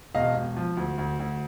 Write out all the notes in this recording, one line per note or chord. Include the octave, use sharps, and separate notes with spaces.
E1 D#5 F5
E1
F3
D2
D2
D2